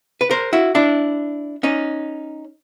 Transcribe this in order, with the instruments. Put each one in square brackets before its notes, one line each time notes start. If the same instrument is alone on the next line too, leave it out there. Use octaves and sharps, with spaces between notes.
[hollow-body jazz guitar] B4
A#4 C5
E4 F#4
D4 E4
C#4 D#4